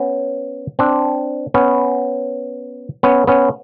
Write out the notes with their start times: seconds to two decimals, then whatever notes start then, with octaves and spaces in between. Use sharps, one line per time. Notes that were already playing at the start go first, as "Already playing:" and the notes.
Already playing: B3 C#4
0.79 C4 D4
1.54 B3 C#4
3.03 B3 C#4
3.27 B3 C#4